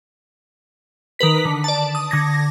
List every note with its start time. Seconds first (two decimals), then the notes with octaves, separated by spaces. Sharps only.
1.19 D#3 A#4 B4 B6
1.45 D3
1.64 D5 A5
1.95 D#6
2.11 D3 G#6 A#6